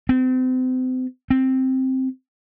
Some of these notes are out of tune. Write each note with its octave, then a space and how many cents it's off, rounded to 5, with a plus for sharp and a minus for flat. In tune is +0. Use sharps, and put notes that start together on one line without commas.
C4 -35
C4 +0